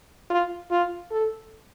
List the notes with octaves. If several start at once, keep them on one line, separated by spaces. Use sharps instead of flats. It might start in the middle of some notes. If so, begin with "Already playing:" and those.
F4
F4
A4